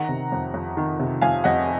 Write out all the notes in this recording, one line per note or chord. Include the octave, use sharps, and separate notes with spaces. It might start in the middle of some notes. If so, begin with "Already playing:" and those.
Already playing: D#3 F#5 A#5
C3
F2
F2
D#3
C3
F2 F5 G#5
F2 D#5 F#5